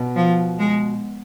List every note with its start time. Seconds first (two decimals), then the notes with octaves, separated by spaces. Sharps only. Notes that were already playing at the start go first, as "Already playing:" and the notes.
Already playing: B2
0.16 F3
0.59 G#3